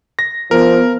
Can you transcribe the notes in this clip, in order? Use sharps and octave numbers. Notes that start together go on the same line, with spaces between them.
A#6
F3 B3 A#4